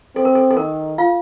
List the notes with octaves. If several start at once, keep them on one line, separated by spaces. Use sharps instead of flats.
C4 A4
A#4
A4
A4
D#3 A#4
F4 F5